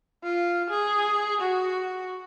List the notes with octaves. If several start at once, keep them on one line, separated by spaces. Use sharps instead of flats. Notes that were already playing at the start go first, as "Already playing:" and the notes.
F4
G#4
F#4